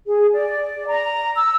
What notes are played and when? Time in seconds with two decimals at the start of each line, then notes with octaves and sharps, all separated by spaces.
0.07 G#4
0.34 D5
0.89 A#5
1.37 E6